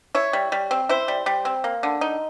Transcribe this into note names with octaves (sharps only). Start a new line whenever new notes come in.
E4 C#5
G3
G3
C4
E4 C5
G3
G3
C4
A#3
D3
D#4